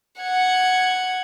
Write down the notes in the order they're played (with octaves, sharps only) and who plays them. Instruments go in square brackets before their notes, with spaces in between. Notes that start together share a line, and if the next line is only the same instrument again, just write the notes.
[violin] F#5 G#6